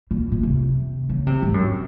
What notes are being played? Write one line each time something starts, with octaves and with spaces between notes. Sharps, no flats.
A#2
A#2
C3
C#3
C3
G#2
F#2